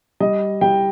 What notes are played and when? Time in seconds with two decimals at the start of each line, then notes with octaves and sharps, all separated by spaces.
0.20 G3 D#5
0.61 G3 G5